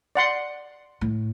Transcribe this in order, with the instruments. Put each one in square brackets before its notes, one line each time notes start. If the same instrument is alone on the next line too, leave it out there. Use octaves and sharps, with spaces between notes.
[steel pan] D5 F#5 C6
[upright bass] A2